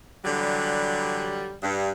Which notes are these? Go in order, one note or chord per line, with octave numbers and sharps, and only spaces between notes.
D3 E3 F#3 G3
G2